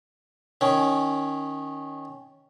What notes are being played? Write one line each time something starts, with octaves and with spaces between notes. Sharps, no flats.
D#3 C#4